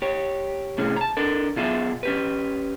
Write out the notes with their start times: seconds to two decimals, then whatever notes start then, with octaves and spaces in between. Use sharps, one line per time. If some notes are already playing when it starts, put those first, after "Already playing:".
0.02 G4 C#5
0.78 A2 C3 C#4 G#4
0.96 A5 A#5
1.17 D4 A4 A#4
1.56 B2 F4 G#4 E5
2.03 C#4 G4 B4